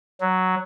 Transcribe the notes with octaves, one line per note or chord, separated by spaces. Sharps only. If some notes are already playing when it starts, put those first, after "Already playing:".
F#3